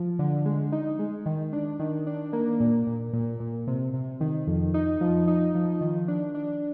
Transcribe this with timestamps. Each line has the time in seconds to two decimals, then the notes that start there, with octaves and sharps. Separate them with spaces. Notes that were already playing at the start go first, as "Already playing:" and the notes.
Already playing: F3
0.19 D3
0.45 G#3
0.72 D#4
0.99 G#3
1.26 D#3
1.53 D4
1.79 D#3
2.07 D4
2.33 A#3
2.60 A#2
2.87 A#2
3.13 A#2
3.40 A#2
3.67 C3
3.94 C3
4.21 D#3
4.47 F2
4.74 D#4
5.01 F3
5.28 D#4
5.55 F3
5.81 D#3
6.08 D4
6.35 D4